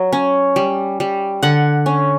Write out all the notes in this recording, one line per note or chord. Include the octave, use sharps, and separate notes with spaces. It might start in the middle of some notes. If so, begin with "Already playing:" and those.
Already playing: F#3
C#4
G3
G3
D3 F#5
C#4